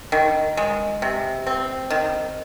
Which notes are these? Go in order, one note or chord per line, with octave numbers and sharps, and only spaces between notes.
D#3
G#3
C3
C4
D#3